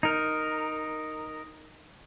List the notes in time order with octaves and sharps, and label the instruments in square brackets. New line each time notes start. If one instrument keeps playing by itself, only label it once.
[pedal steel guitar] D#4 A#4